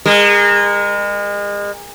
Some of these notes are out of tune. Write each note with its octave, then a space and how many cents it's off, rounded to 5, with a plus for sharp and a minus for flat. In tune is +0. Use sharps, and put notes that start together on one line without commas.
G#3 -35 A#4 +0